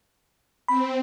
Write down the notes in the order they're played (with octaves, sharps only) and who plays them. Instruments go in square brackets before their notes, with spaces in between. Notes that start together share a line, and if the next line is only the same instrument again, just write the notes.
[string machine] C4 [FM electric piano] B5